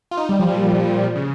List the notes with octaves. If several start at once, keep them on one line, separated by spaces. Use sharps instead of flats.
F4
D#4
G3
F3
A#2
A#2
C#3